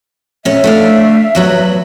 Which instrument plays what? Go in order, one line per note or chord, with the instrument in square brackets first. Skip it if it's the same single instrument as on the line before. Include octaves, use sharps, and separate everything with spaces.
[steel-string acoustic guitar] A#2 C#4 [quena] E5
[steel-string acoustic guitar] A3 D4 F5
E2 F#3 B4